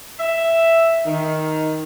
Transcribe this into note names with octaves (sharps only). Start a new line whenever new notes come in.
E5
D#3